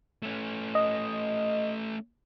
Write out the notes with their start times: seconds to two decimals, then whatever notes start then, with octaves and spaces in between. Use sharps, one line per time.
0.23 A3 C#4
0.75 D#5